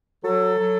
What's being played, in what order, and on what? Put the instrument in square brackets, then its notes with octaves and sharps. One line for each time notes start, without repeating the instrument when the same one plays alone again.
[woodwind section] F#3 A4
F#3